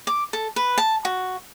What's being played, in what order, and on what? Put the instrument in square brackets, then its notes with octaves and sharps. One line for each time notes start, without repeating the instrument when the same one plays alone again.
[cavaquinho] D6
A4
B4
A5
F#4